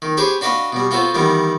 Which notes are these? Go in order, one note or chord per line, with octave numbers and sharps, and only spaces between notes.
D#3
G4 G#4 B4 C5 C#6
D4 F#4 B4 D#5 F5
B2 G3
B3 F4 F#4 A4 C5
D#3 E3 G3 B3